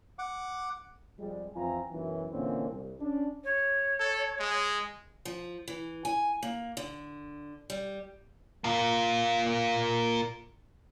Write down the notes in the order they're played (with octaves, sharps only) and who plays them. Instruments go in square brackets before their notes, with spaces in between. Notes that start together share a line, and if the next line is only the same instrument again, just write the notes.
[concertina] F#5 D6
[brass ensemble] F2 G3 G#3
F2 E3 C4 F4 G#5 A#5
B1 F#2 E3
A#2 D3 E3 A#3 C4 C#4
C2
C#4 D4
[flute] C#5
[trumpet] A4
G#3
[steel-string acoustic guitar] F3
E3
G#5
A#3
D3
G3
[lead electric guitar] A#3 F4